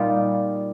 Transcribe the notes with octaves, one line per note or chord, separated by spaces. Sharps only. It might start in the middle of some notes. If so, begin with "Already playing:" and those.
Already playing: A#2 G3 D#4 F4